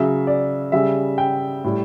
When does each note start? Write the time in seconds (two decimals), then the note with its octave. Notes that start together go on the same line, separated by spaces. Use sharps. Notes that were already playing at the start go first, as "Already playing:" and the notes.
Already playing: C#3 F#3 E5
0.27 D5
0.72 C#3 G3 E5
1.18 G5
1.64 A2 G3